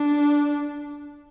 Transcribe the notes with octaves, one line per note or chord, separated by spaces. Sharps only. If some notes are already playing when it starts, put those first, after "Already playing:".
Already playing: D4